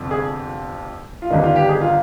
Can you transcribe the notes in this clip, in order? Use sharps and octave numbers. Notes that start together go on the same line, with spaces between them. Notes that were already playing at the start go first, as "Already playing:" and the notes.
Already playing: G1 F2 C3 F3
G#4
F4
G1 G2 D#3 D#4
F4
G4
G#4
F4